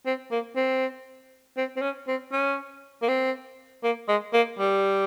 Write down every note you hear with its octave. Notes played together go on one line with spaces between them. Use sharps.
C4
A#3
C4
C4
C4
C#4
C4
C#4
A#3
C4
A#3
G#3
A#3
G3